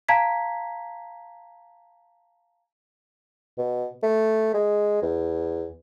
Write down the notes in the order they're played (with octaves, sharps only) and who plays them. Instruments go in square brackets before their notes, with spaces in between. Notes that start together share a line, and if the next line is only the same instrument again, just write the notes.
[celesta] F5 A5 A#5 G#6 B6
[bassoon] B2
A3
G#3
E2